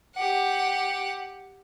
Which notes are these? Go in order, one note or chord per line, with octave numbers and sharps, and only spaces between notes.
G4 F#5